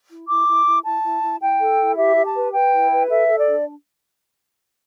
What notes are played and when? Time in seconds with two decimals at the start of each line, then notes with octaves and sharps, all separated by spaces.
0.10 E4
0.28 E4 D6
0.47 E4
0.66 E4
0.84 E4 A5
1.03 E4
1.22 E4
1.40 E4 G5
1.60 A4
1.79 E4
1.97 G4 E5
2.16 G4
2.25 A5
2.34 B4
2.53 B4 G5
2.72 E4
2.91 B4
3.09 A4 E5
3.28 A4
3.38 D5
3.47 D4